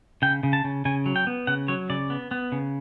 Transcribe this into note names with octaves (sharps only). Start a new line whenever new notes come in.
C#3 G5
C#3
A5
C#3
C#3 G#5
F#3
G5
B3
C#3 F#5
F#3 C#5
C#3 D5
B3
B3
C#3